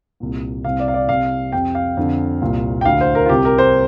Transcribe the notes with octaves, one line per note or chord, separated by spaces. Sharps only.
C2 A#2
C2 C3 F5
D5
F5
D5
C2 C3 F5
F2 C3 G5
F5
F2 D3
C2 A#2
G5
D2 D3 F5
C5
A#4
F4
C2 C3 G4
A#4
C5